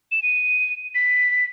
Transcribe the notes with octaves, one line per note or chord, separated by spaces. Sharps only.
E7
D#7
B6